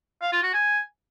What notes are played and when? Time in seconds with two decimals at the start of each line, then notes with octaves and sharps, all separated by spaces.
0.22 F5
0.32 F4
0.43 F#4
0.54 G#5